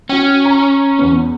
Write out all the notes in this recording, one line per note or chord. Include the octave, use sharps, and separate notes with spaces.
C#4 F#4 G5
A#5
E2 B3